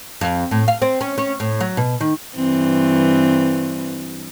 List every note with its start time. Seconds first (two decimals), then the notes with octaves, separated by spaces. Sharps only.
0.21 F2
0.51 A2
0.68 F5
0.82 C4
1.01 C#4
1.18 C#4
1.40 A2
1.61 F#3
1.77 B2
2.00 D#3
2.35 G2 E3 C4